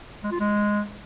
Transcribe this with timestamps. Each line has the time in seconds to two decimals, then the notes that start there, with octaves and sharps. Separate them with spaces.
0.24 G#3
0.32 F4
0.40 G#3